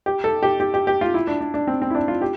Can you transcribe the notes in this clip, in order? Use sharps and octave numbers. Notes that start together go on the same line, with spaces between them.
G4
A4
G4
G4
G4
G4
F4
E4
D4
D4
D4
C4
C4
E4
D4
F4
G4